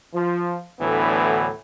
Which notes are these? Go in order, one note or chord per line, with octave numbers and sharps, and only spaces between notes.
F3
D2 A2 D3 E3 F#3 B3